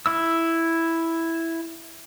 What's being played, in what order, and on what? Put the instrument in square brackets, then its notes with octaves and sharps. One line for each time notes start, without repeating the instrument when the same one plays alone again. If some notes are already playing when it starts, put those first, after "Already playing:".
[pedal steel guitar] E4 E6